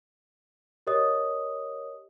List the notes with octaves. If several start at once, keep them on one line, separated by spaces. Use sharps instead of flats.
G4 A#4 C#5 D#5 D#6